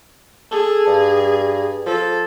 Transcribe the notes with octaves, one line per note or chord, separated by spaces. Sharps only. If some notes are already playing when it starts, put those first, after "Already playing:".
G#4 A4
G2
F3 A4